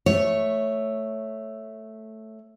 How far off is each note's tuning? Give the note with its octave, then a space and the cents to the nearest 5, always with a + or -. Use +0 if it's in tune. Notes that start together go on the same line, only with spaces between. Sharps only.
A3 +0 C#5 +0